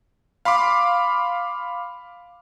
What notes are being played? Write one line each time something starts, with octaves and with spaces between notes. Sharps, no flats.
F5 B5 C6 D6